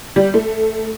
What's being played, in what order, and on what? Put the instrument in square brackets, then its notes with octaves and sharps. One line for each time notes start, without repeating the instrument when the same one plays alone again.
[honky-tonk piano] G3
A3